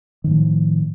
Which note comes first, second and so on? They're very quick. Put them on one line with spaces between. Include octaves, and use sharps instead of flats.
D#3 A2 F3